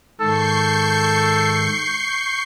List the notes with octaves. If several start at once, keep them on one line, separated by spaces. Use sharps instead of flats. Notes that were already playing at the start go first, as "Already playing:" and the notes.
G#2 D#3 A4 C#6 G6 C7